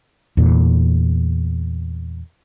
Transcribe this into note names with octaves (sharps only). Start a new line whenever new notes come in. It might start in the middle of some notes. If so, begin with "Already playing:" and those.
E2 A#2